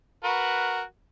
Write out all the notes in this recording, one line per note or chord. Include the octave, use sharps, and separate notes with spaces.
F#4 A#4 B4